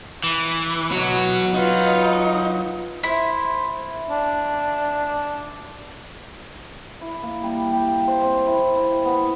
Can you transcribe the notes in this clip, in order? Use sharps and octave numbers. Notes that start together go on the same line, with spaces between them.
E3
F#3 B3 F#4
D#4 F4 B4
E4 C5
D4
E4
A#3
G3
G4
C5
C4
E4
E4
B3